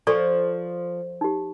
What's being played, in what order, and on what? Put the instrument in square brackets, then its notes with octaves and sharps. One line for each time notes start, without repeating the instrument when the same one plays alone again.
[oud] F3 [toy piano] A4 D5 C#6
[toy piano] D#4 G4